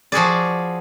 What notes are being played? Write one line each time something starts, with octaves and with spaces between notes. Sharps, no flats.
F3 F#4 G#4 D5